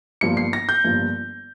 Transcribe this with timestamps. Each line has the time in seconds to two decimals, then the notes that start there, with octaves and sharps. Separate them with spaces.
0.21 G1 G2 F3 A#3 C#7
0.37 C7
0.53 A#6
0.69 G6
0.84 G1 G2 F3 A#3